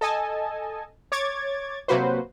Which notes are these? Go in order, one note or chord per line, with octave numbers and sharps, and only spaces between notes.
A4 D#5 G#5 A5
C#5 D6 G#6 A6
C3 F#3 A#3 F#4 B4 C5